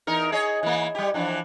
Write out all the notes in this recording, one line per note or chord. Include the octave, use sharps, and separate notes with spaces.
E2 D#4 A#4
G#4 C#5 D#5
E3 A#3
G3 G4
E3 F3 D4